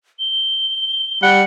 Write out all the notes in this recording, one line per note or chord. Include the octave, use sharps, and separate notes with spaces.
G7
G3 F#5